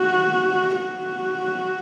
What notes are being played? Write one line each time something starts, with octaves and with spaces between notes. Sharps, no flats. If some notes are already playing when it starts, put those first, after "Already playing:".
Already playing: F#4
F#4